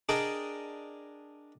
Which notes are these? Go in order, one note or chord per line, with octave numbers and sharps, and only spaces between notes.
D4 G#4 A#4 D5 D#5 G5